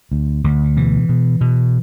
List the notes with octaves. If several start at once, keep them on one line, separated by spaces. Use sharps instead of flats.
D2
D2
B2 E3
B2
B2